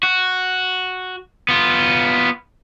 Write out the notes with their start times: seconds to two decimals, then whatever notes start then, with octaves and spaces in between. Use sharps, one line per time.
0.03 F#4
1.49 B3 F4